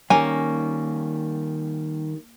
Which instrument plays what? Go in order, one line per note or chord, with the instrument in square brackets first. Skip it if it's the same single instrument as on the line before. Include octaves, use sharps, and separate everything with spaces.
[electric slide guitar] D#3 G3 [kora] A#3 C#4 [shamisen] G#5